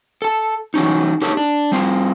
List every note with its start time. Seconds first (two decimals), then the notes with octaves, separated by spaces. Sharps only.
0.22 A4 A5
0.74 E3 F#3 C#4 D#4
1.22 D#4 G4 A4 A#4 C#5
1.37 D4
1.72 G3 C4 F4